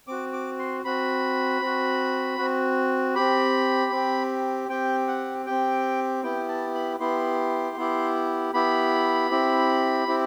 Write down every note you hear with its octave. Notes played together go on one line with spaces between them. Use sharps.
C4 F#4 D6
D6
C6
C4 F#4 B5
C4 F#4
C4 F#4
C4 G4 B5
C4 G4
C4 G4 G5
F#5
C4 G4 G5
B3 E4 G4 G5
A5
B5
B3 E4 G4 C6
B3 E4 G4
B3 E4 G4 B5
C4 E4 G4
C4 E4 G4